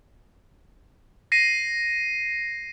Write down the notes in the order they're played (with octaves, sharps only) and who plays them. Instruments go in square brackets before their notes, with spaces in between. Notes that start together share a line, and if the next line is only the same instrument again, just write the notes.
[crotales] A#6 C7 D#7